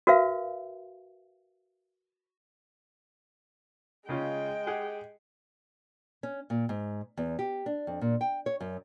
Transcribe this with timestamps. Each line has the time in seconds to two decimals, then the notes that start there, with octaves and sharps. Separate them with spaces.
0.07 F#4 A#4 B4 E5 F5
4.09 C#3 G#3 C#4 F4 G5
4.67 G4 G#4 F#5
6.23 C#4
6.50 A#2
6.69 G#2
7.17 E2
7.39 G4
7.66 D4
7.87 F2
8.01 A#2
8.21 G5
8.46 C#5
8.60 F#2